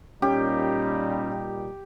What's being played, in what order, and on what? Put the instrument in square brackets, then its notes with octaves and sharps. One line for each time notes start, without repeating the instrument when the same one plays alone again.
[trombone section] A#2 G3 [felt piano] C#4 [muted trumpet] D#4 [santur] G4